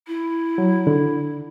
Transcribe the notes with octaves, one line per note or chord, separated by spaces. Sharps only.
E4
F#3
D3